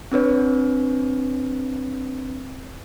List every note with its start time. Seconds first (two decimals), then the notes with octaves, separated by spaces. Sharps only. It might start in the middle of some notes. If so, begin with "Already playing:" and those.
0.12 C4 D4 B4 C#5